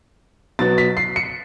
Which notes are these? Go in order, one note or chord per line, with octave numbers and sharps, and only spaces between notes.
B2 F#3 B3 A6
B6
C7
C#7